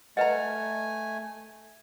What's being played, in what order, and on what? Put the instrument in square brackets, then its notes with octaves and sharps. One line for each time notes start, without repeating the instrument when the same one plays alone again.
[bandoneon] A3 G#5 [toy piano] B4 D#5 [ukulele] F#5 A#5